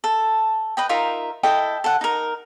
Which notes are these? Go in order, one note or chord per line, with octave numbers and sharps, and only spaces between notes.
A4
B4 D#5 G5
D#4 F4 A#4 E5
E4 A4 D#5 G5
A4 F#5
D#4 A#4